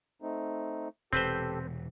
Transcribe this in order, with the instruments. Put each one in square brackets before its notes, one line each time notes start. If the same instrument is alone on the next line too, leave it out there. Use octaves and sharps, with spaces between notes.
[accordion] A3 C4 D#4
[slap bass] E1 C3 [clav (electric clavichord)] C4 B4 C5 [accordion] G4 A4